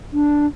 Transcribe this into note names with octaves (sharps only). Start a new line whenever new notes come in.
D4